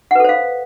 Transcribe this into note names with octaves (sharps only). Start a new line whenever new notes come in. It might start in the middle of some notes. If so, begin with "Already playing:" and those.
A4 B4 C5 F5 F#5